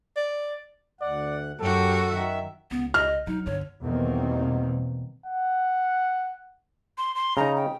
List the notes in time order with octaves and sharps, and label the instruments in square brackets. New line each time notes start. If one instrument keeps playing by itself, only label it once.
[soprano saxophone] D5
[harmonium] D2 F#5 [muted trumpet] D5
[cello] F#2 F#4 [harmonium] G4 [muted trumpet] A4
[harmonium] D#3 E5
[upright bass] C#2 [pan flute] B3
[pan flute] D#5 [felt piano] F6
[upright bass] F#3 [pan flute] D#4
[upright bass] G1 D3 [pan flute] C#5
[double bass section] E2 B2 D#3 G3 A#3 C4
[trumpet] F#5
[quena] C6
C6
[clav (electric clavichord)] C#3 D#4 [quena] A#5
[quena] G5